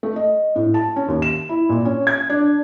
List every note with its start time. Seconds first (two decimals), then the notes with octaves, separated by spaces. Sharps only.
0.03 A3
0.16 D#5
0.56 A2
0.74 A5
0.96 C#4
1.08 D#2
1.22 E7
1.49 E4
1.69 A#2
1.85 C#4
2.07 G#6
2.30 D4